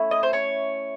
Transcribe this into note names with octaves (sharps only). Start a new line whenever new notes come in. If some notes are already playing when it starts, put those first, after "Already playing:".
Already playing: A3 C#4 E4
D#5
C5
C#5